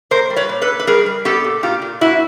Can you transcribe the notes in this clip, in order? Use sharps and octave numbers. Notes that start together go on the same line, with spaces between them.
A#2 A#4 C5
G3
B4 C#5
A#2
A4 B4
A#2
B4
G3 G#4 A#4
G3
B3 G4 A4
A#2
A#2 F4 G4
A#2
A#2 E4 F#4